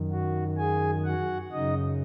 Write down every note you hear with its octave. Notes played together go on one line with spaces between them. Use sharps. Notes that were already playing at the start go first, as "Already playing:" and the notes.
Already playing: F#2 D#3
F#4
G#4 G#5
F#4 F#5
F#2 C#3 D#4 D#5